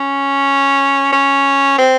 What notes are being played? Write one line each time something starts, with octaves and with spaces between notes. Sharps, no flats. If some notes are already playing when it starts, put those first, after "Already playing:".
Already playing: C#4
C#4
C4